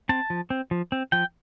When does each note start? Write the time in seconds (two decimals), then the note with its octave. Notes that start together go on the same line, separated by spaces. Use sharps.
0.09 C4 A5
0.30 F3
0.50 C4
0.71 F3
0.92 C4
1.12 F3 G5